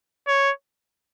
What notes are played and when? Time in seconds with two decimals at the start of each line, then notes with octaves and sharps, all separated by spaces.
0.28 C#5